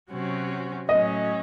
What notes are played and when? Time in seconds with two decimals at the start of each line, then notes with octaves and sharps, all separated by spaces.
0.11 C3 F#3 C#4 F#4
0.89 A2 F#3 C#4 D#5